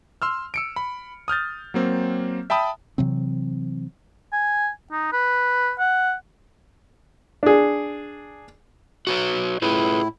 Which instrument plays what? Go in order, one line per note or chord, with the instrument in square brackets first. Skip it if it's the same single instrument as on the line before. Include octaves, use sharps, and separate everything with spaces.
[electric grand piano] C6 E6 F6
E6 C#7 D7
B5
D#6 F6 G6 A6
F#3 A#3 C4
E5 G5 A5 B5 D#6
[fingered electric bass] C3 E3 F#3 C4
[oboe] G#5
D#4
B4
F#5
[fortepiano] D4 G#4
[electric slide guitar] F#4 B4 C#5
[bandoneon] A2 E4 [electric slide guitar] F4 G#4 B4